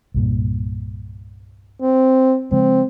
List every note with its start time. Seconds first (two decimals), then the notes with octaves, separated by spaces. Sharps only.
0.14 C2 G2 A#2
1.82 C4
2.52 C#3 F3 G#3 C4